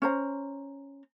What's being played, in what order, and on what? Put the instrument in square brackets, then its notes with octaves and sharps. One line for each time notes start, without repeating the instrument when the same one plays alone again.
[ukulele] C#4 C5 A#5